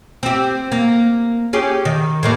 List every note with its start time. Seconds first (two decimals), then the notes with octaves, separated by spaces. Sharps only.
0.23 C4 G4
0.72 A#3
1.53 C#4 G4 G#4
1.85 D#3
2.23 A2 G3 A#3